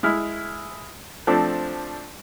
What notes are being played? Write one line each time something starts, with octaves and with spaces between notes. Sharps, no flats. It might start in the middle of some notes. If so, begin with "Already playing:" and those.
G#3 E4 F6
F3 A3 C4 D4